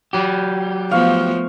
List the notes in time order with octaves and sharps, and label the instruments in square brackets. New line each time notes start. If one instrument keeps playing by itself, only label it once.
[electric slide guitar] F#3 G4
[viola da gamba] F3 A3 B3 [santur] F5 C#6